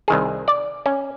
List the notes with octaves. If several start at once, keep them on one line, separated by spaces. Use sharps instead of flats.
C2 D#3 G#4
D5
C#4